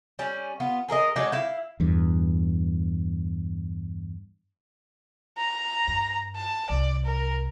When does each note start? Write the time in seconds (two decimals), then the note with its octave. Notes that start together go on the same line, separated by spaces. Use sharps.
0.19 G3 C#4
0.60 B3 F4
0.89 G#4 A#4 B4 D#5
1.16 F#3 G#3 D4 D#4
1.32 E4 F5
1.80 E2 G2
5.38 A#5
5.88 G2
6.36 A5
6.70 C2 D5
7.05 A#4